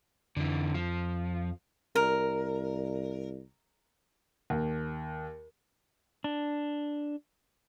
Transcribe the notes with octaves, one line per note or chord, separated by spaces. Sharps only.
F2 D3 E3
F3
C2 A#4
D#2
D4